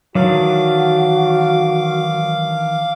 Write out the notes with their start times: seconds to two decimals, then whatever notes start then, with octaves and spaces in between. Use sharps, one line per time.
0.15 D#3 E3 F#3 D4 F#4 F5 D6